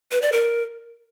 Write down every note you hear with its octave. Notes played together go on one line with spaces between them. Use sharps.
B4
D5
A#4